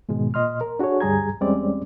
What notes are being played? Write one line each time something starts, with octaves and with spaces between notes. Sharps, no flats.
G#2 B2 D#3 G#3
A#2 D#5 C6 F6
A#4
D4 F#4 G#4 A4 C#5
D2 G2 G3 G#4 A#5 G#6
E2 G3 G#3 C4 C#4 D5